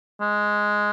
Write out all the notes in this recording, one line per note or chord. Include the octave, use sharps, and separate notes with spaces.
G#3